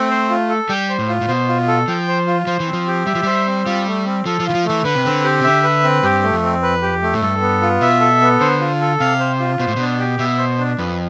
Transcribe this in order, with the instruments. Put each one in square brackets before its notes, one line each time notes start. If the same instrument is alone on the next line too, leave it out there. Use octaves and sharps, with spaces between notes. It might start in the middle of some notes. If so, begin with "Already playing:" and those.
Already playing: [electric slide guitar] A3 [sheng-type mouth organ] C4
[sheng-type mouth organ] C5
F4
A4
[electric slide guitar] G3 [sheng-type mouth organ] G5
[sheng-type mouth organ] C5
[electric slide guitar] A2
[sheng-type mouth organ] F4
[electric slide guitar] A2
[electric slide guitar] B2 [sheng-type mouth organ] C5
[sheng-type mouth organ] F4
A4
[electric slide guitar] F3 [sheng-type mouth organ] G5
[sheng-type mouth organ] C5
F4
[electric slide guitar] F3 [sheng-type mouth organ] C5
[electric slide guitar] E3
[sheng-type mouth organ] C4
[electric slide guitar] F3
[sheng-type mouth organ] G4
[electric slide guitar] G3 [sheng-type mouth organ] E5
[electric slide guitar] F3
[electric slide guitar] G3 [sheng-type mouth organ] C5
[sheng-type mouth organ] C4
[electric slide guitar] G3 [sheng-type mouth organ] F4
[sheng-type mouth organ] A3
C4
[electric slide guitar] F3 [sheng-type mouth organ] A4
[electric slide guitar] F3
[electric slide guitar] E3 [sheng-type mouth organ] F4
[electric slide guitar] F3
[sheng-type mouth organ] A3
[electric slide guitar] E3
[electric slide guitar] D3 [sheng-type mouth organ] B4
[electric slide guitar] C3
[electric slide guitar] D3 [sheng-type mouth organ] C4
[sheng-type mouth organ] G4
[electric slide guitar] C3
[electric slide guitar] D3 [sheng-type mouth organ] E5
[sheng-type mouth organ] B4
C4
[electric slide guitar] G2 [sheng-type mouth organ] G4
[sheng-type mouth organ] A3
[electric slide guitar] F2
[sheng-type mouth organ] C4
B4
G4
A3
[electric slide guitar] A2
[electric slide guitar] G2 [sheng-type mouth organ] A4
[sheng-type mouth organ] B3
F4
[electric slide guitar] B2 [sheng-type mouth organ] E5
[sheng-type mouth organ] A4
B3
[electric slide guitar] D3 [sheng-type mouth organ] C5
[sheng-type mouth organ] F4
A4
[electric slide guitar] C3 [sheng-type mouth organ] F5
[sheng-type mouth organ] C5
F4
[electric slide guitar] B2 [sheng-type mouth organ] C5
[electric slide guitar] A2
[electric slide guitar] B2 [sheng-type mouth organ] D4
[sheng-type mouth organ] G4
[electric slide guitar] B2 [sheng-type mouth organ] E5
[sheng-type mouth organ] C5
D4
[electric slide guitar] F2 [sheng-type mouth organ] B4